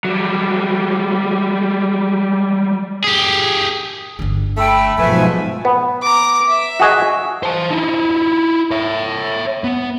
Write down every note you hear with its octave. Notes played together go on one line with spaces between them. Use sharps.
F#3 G3
G4 G#4
G1 D3
A3 G5 B5 E6
G#2 B2 F3 F#3 A3 B4 E5 G#5
B3
A#5 D6
E5
F#4 G#4 D#5
C5 A5
D#4 E4
C#5 E5
B3